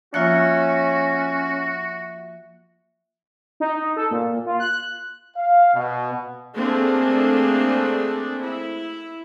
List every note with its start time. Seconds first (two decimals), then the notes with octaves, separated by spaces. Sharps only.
0.14 F3 A#3 C#4 F4 F#4 E5 F#6 C#7
3.60 D#4
3.96 A4
4.11 A#2
4.46 F4
4.60 F#6
5.37 F5
5.74 B2
6.55 A3 A#3 C4 D4 G#4
8.42 E4